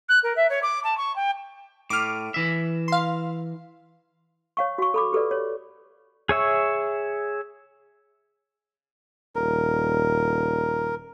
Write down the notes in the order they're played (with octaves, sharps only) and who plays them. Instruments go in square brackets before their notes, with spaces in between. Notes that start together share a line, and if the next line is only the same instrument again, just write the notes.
[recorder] F#6
A#4
E5
C#5
D6
A5
C#6
G5
[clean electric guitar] A2 [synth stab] D6 F6
[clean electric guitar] E3 E5
[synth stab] F5 C6
[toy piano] C#5 F5 C#6
F#4 C#6
A4 B5 D6
G4 A4 B4 D5
C#5
[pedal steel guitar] G#4 C#5 E5 C#6
[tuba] D#1 [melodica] A#4